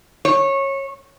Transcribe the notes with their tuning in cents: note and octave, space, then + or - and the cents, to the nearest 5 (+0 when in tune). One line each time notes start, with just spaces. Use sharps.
C#5 -20